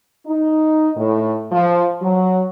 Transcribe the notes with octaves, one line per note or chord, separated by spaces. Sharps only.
D#4
A2
F3
F#3